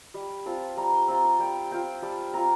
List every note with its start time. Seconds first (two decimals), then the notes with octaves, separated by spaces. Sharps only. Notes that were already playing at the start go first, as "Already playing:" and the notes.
0.14 G3
0.46 C4 F4 A5
0.77 G3 A#5
0.93 C6
1.08 C4 F4 A#5
1.25 C6
1.39 G3 G5
1.71 C4 F4 G5
2.02 G3 A5
2.34 C4 F4 A#5